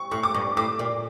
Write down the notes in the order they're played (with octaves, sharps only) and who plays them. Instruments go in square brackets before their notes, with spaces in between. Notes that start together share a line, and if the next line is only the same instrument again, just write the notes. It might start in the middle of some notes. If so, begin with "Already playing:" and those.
Already playing: [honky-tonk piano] C#6
[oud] A2 [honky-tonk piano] C#6
[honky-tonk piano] D6
[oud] G2
[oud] A2 [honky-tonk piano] D6
[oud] A#2